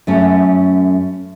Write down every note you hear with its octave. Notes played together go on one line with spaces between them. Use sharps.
F#2 A3 C#4